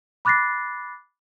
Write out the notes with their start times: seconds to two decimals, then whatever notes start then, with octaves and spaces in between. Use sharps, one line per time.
0.25 B5 D6 F#6 A6 A#6 C7